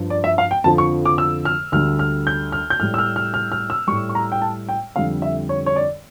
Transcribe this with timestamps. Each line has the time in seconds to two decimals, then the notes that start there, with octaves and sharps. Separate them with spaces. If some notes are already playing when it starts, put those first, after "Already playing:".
Already playing: G2 F3
0.10 D5
0.24 E5
0.38 F5
0.51 G5
0.64 F2 D3 F3 A5
0.78 C#6
1.05 D6
1.18 E6
1.45 F6
1.72 D2 D3 G3 F6
1.99 F6
2.27 G6
2.52 F6
2.70 G6
2.80 A2 G3 F6
2.94 E6
2.98 F6
3.16 F6
3.34 F6
3.52 F6
3.70 E6
3.87 G3 C#6
3.91 A2
4.09 C#6
4.15 A#5
4.32 G5
4.42 A5
4.69 G5
4.96 F2 D3 G3 F5
5.22 E5
5.49 C#5
5.66 C#5
5.76 D5